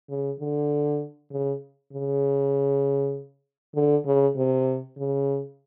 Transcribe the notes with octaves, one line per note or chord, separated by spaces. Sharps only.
C#3
D3
C#3
C#3
D3
C#3
C3
C#3